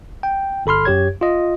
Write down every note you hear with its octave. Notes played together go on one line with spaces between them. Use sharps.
G5
G1 A4 B5 C6 F6
F#2 G4 C#5 G#6
F4 D#5